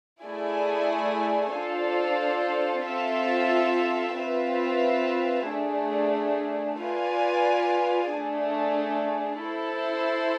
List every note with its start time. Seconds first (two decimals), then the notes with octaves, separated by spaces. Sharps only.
0.23 A3 E4 G#4 D5 G#5
1.54 D4 F4 A4 C5
2.85 C4 F4 A4 E5
4.16 C4 F4 B4 E5
5.49 A3 D4 G#4
6.79 F4 B4 D5 G#5
8.11 A3 D4 G#4
9.42 E4 A4 C5